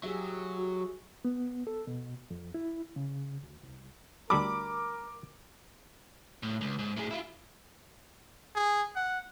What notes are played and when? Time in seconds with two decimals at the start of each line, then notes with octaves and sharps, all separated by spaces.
0.04 F#3 G4 G#4 E5
0.57 F#4
1.25 B3
1.67 A4
1.87 B2
2.31 F2
2.54 E4
2.96 C#3
3.43 D2
3.63 C2
4.30 D2 G3 A4 A#4 B5 D6
6.43 A2
6.61 C#2
6.79 G#2
6.97 A2 G#4
7.11 E4 F4
8.55 G#4
8.96 F#5